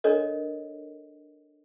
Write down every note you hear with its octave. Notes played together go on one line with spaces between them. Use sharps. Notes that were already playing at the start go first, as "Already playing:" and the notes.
D4 A4 A#4 C#5 D#5